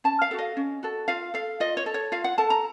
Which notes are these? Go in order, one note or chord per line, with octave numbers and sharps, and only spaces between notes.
C#4 A5
F5
F#4 A4
D#5
C#4
F#4 A4
F4 F5
A4 F5
F4 D#5
C#5
A4
C#5
F4 F5
F#5
A4 A5
A#5